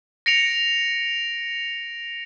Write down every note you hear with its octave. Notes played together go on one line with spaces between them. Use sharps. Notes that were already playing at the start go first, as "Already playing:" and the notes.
A#6 C#7 D7 F7